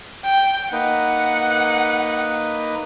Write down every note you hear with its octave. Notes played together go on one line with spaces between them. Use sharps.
G5
A#3 D#4 B4 F#5